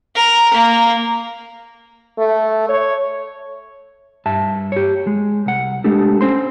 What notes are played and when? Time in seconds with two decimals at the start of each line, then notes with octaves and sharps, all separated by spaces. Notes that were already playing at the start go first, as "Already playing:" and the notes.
0.15 A#4
0.54 A#3
2.18 A3
2.69 C#5
4.26 G2 E5 A5
4.72 G4 C#5
5.07 G#3
5.46 C2 F#5
5.84 G#3 A3 D4 G4 A4
6.21 C#4 C5 C6